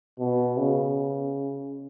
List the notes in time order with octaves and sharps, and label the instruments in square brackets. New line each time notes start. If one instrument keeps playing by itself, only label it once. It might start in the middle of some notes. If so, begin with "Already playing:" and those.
[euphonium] B2
C#3